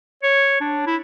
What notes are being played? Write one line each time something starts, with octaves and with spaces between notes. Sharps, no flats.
C#5
D4
E4